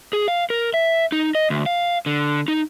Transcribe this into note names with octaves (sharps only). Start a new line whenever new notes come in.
G#4
F5
A#4
E5
D#4
D#5
D2
F5
D3
D#4